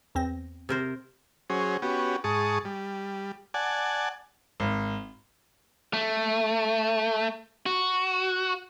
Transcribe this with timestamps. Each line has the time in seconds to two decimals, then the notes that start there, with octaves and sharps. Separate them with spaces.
0.15 E2 C4 A#6
0.69 C3 A#4 C5
1.50 F#3 C#4 G#4 C5
1.82 B3 C#4 F#4 G4
2.24 G#2 G#4 A5 C#6 D#6
2.65 G3
3.54 D5 F#5 G#5 A5
4.60 G#1
5.94 A3
7.66 F#4